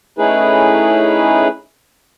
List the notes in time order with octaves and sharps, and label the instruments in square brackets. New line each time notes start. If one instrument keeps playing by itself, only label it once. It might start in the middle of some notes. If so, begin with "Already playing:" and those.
[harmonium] A3 C#4 D#4 E4 G#4 B4